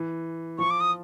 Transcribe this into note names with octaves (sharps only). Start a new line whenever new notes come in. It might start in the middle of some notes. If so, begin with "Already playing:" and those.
Already playing: E3
F3 C#6
D6
D#6